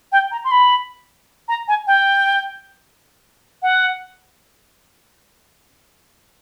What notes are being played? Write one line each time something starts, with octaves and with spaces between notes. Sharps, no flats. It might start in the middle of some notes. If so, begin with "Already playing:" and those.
G5
A#5
C6
B5
A#5
G#5
G5
F#5